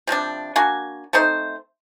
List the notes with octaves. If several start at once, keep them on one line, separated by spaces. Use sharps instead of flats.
C3 F3 G3 D4
A#3 D4 F#4 G#5
A3 C4 D#4 C5